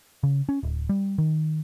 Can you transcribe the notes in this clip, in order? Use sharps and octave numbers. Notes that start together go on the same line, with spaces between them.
C#3
C#4
D1
G3
D#3